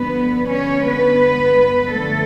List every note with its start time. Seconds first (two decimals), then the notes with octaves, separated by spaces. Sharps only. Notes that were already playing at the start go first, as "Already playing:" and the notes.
Already playing: G2 D3 F3 B3 B4
0.49 C#4 C#5
0.84 B3 B4
1.90 F#2 D3 F3 A3 A4